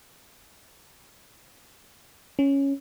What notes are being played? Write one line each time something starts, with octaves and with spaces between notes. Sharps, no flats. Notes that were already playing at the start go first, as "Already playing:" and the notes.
C#4